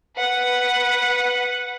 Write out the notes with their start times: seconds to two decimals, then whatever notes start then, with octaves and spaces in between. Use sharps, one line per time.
0.16 B4 F#5